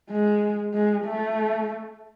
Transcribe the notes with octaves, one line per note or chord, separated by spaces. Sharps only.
G#3
G#3
A3